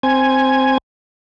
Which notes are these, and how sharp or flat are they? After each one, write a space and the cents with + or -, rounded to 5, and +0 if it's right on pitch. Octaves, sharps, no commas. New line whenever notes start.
C4 +0 G#5 +0